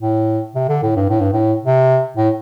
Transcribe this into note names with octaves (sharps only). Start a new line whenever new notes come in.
A2
C3
D3
A2
G2
A2
G2
A2
C3
A2